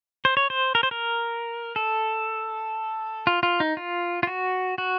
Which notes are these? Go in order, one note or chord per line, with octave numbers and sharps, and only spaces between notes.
C5
C#5
C5
A#4
C5
A#4
A4
F4
F4
D#4
F4
F4
F#4
F#4